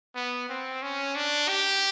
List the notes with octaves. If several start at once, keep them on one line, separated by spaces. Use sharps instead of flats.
B3
C4
C#4
D4
G4